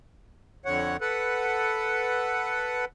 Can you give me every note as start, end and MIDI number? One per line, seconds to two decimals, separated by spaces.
0.65 0.97 41
0.65 0.97 50
0.65 0.97 73
0.65 0.97 78
1.01 2.85 69
1.01 2.85 71
1.01 2.85 78